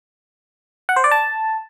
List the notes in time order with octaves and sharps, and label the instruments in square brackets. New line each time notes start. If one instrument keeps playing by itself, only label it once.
[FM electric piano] F#5
C5
D5
A5